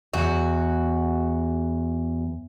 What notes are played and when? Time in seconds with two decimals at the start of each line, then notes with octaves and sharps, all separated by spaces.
0.14 E2 F#4